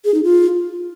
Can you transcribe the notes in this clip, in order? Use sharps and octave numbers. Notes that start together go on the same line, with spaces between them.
G#4
D#4
F4